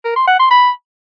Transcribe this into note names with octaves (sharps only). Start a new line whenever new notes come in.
A#4
C6
F#5
C6
B5